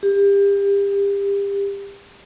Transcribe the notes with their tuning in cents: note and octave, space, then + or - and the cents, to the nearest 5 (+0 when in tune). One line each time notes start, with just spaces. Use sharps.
G4 +30